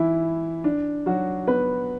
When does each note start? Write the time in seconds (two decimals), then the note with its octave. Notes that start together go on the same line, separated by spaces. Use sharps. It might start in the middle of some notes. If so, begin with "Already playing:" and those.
Already playing: E3 E4
0.64 D4
1.06 F#3 F#4
1.47 B3 B4